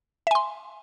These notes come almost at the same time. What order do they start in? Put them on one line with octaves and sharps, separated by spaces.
E5 G#5 C6